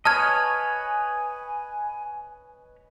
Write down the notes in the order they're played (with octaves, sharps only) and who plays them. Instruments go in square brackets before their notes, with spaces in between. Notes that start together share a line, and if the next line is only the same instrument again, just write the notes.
[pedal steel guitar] B4 C#5 D#5 [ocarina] G#5 [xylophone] A5 F6 G#6